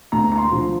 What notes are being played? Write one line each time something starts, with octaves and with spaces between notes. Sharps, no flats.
D2 A#5
A#5
C6
D3 F3